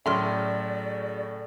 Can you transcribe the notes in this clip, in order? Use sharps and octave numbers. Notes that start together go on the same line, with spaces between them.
A2 C#3 F#3 C#4 D5 E5 C6 F6